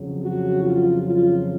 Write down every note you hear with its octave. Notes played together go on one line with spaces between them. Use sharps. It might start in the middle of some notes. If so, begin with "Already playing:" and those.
Already playing: F2 C#3 F#3
F#4
F4
F4